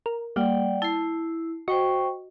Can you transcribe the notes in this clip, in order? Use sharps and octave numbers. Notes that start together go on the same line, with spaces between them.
A#4
G3 A#3 D5 F#5 G5
E4 A5 C7
F#4 C5 D#5 G5 C#6